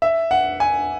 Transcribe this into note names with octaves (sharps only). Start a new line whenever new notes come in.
E5
F#5
G#5